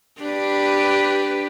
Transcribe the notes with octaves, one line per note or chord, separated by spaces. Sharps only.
D4 G4 B4